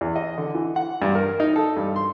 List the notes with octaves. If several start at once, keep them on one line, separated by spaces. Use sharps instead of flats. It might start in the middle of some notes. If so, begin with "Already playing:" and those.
E2
D#5
D3
E3
F#5
G2
A#4
D#4
A4
G2
C6